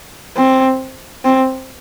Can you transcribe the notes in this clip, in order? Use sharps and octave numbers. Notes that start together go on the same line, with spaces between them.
C4
C4